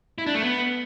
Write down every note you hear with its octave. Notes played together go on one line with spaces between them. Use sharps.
E4
D4
A3
B3